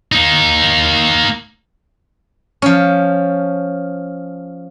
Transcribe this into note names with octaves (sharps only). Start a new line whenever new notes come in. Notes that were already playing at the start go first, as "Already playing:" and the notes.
A#3 D#4
F3 C#4